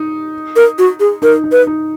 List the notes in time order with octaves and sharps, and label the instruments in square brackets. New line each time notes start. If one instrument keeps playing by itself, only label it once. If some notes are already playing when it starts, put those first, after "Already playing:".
Already playing: [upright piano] D#4
[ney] A#4
F#4
G#4
[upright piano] D#4 [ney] A#4
[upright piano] D#4
[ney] B4
[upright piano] D#4